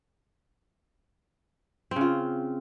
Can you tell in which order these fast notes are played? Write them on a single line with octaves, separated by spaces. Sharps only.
C4 C#3 F4